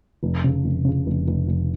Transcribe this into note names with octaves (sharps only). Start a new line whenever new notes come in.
F1
C#3
F1
C#3
F1
F1
F1